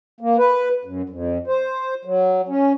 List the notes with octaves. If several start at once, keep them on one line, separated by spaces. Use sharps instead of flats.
A#3
B4
F#2
F2
C5
F#3
C#4